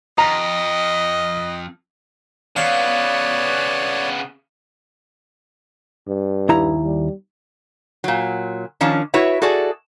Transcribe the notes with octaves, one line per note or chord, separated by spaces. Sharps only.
F2 D#5 A#5
C#3 B3 C#5 D5 F5
G2
D#2 E4 A#5
G3
A#2 F#3
D#3 F3 C#4 D4
E4 F#4 B4 C#5 E5
F#4 G#4 A4 D5